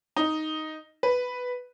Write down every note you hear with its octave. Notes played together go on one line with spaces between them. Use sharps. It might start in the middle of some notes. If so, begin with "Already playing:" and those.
D#4
B4